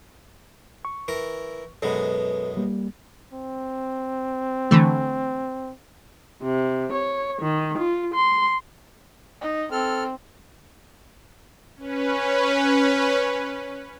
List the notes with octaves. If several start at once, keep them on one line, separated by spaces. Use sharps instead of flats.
C#6
E3 A#4
F#2 B2 G#3 A4 B4
G3 A#3
C4
D3 E3 A3
C3
C#5
D#3
F4
C6
D#4
C4 A4 F6
C#4 B4